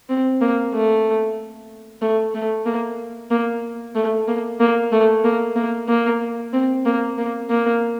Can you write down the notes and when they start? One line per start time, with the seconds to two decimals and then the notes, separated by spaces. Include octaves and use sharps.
0.09 C4
0.41 A#3
0.74 A3
2.02 A3
2.34 A3
2.66 A#3
3.31 A#3
3.95 A3
4.28 A#3
4.60 A#3
4.92 A3
5.24 A#3
5.56 A#3
5.89 A#3
6.53 C4
6.85 A#3
7.18 A#3
7.50 A#3